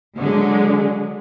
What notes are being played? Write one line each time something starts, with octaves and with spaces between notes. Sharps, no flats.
D3 F#3 G#3